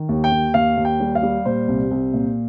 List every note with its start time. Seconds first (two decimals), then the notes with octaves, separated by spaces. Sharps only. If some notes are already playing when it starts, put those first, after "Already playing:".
Already playing: D#3
0.09 D#2
0.24 G5
0.32 D#2
0.54 D#2 F5
0.77 D#2
0.85 G5
1.00 G3
1.15 F5
1.23 G3
1.45 A#2 C5
1.68 C2
1.91 C2
2.13 A#2